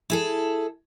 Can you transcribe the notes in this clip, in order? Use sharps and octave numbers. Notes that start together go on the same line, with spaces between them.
E4 G#4 A4